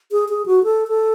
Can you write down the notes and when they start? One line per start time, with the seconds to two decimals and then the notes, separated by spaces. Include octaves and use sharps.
0.12 G#4
0.29 G#4
0.46 F#4
0.64 A4
0.88 A4